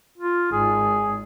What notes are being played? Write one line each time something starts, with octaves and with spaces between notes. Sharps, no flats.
F4
G#1 G#4